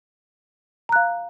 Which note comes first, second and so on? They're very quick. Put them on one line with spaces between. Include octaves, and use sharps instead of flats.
A#5 F#6 F5